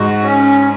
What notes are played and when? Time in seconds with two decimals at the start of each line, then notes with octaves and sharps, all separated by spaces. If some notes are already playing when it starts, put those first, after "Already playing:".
Already playing: G#2 F#4
0.23 C#4